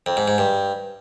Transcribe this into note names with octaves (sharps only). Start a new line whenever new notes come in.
F2
G#2
G#2
G2